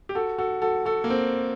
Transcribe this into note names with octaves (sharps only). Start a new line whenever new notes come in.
G4
F#4 A4
F#4 A4
F#4 A4
F#4 A4
A#3
C4